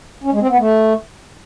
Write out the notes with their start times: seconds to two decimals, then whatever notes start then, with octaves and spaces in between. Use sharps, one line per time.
0.24 C#4
0.32 G#3
0.41 C4
0.49 B3
0.58 A3